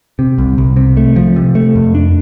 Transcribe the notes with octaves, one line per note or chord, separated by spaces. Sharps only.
C3
C2
C2
C3
A3
F3
C3
A3
F2
D4